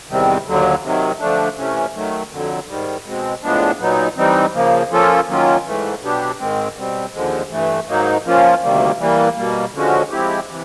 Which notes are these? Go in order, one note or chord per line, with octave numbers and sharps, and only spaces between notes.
E2 C3 D#3 G3 C4
D#2 D3 F#3
C3 D#3 F#3
D3 F3 A3 D4
C3 E3 A3 C#4
D#3 F#3 A3
F2 D3 F#3
G#2 D#3 G3
B2 G#3 C4
A2 F3 G#3 B3 D4
A#2 F#3 B3 D#4
E3 G3 C4 D#4
C#3 F3 A#3
F3 A#3 C#4 F4 A4
D#3 F#3 A#3 C#4 F4
G#2 E3 A3
B2 F#3 B3 D4 G4
G#2 D#3 G#3 C4
B2 G3 C4
D#2 D3 F3 G#3
G2 E3 A3
G#2 D#3 F#3 A#3 D#4
F3 A#3 C#4 F4
D2 C3 D#3 G3 A#3
E3 G3 A#3
B2 G3 A#3
D3 F3 G#3 C#4 F#4
F3 G#3 C4 E4 G4
C3 E3